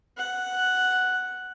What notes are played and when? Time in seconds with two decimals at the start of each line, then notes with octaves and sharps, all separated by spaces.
0.18 F#5